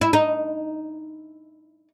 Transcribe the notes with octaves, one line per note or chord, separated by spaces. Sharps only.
E4
D#4